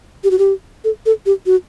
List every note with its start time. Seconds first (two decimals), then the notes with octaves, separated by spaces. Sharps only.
0.24 G4
0.31 F#4
0.39 G4
0.84 A4
1.06 A4
1.26 G4
1.46 F#4